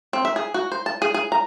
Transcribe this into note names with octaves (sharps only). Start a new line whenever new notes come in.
C4
E5
G#4
F#4
C5
A5
G#4
G#4
A#5